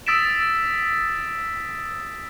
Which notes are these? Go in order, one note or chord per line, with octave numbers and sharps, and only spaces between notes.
D#6 E6 A6 B6 D7 E7